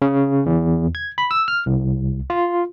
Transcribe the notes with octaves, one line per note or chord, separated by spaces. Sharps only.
C#3
E2
G#6
B5
E6
F6
C2
F4